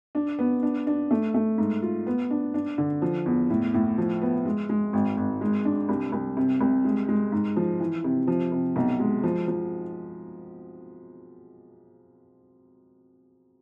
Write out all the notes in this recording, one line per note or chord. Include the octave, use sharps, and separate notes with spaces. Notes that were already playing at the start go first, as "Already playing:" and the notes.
D4
B3
D4
D4
A3
A3
G#2
F4
B3
D4
D4
D3
F3
E2
A2
A2
F3
B3
G#3
G#3
G#1
G#1
G#3
D4
C2
C2
C3
C2
G#3
G#3
G#2
F3
E3
C3
F3
C3
B1
G#3
F3
F3